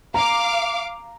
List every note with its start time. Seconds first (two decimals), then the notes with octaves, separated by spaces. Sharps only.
0.14 F5 A#5 D6